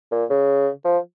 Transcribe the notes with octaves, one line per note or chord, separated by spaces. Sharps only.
A#2
C#3
F3